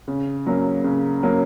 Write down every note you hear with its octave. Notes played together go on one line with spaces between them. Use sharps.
C#3
F#3 A#3 C#4
C#3
F#3 A#3 C#4